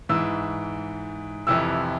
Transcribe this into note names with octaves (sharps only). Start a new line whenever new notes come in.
G#2 E3 E6
F2 C3 E3 E6